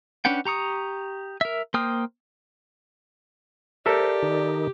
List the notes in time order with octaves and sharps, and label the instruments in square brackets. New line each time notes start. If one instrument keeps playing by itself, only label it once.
[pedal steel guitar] C#4 D4 B4 F#5 G5
G4 A#5 C#6 D#6
A#4 E5
A#3 C5 G5 D#6 F6
[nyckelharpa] G4 [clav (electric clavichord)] A4 A#4 E5 [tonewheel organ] C5 [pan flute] D5
[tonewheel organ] D#3 D#4